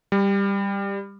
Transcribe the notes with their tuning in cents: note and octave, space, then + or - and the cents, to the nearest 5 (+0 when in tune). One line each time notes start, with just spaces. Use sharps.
G3 +15